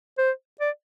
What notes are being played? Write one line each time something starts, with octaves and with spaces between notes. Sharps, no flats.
C5
D5